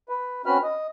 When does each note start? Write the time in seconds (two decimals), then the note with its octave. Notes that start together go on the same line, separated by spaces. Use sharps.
0.09 B4
0.46 C4 C#4 F#4 B4 B5 F6
0.64 D#5